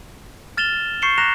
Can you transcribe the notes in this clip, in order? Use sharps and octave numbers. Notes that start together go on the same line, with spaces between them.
F6 A6 E7 F7 G7
C#6 G6 C7 C#7 E7 G7
A#5 D6 F#6 A#6 E7 F7